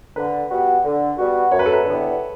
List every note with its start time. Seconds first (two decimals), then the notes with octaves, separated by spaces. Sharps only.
0.16 D3 B4
0.50 G3 B3 F#4
0.84 D3
1.18 G3 B3 F#4
1.51 F#2 C#5
1.59 B4
1.66 A4
1.73 B4
1.85 D3 G3 B3 E4